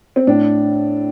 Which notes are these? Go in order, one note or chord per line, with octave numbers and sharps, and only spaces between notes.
C4
A2 D4